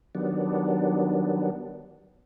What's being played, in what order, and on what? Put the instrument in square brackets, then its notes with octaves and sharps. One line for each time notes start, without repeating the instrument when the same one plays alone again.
[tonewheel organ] D#3 F#3 G3 B3 D4